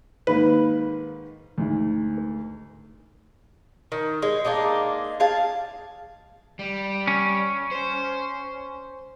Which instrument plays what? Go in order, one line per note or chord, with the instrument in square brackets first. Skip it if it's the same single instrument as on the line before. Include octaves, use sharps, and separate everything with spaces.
[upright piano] G#2 D#3 A#3 [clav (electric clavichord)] B4
[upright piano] D2 G#2
[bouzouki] D#3
G#3
G#3 A#3 D4 D#4
G#4 F5 A5
[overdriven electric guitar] G3
[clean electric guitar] C#4
[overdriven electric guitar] C5